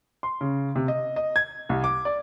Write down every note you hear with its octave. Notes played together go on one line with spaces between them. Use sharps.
C6
C#3
C3
D#5
D#5
G#6
C2
D6
D5